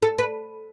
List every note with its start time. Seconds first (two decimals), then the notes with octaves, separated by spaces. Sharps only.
0.02 A4
0.18 B4